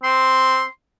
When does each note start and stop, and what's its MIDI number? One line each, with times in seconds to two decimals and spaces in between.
0.03 0.62 60
0.03 0.68 84